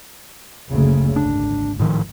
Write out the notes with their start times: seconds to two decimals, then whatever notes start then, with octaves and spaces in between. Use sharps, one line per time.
0.69 F#1 D2 C#3
1.16 G#1 D4
1.80 A2 D#3 F3